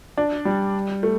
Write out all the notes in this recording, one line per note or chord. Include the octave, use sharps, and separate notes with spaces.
D4
G3
A3